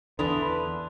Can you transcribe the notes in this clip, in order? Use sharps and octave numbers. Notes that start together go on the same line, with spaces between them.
E2 D3 E3 D4 B4 C6 D#6 F7